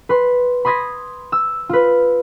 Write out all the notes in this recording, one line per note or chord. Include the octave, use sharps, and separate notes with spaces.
B4 C6
B5 C6 D#6 G#6 A#6 B6
E6
F4 B4